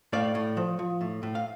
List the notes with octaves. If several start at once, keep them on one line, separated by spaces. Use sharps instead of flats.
A2 D5 F5
A2
F3
F3
A2
A2
F5